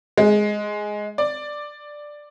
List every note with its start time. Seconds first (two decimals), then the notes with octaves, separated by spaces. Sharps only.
0.18 G#3
1.18 D5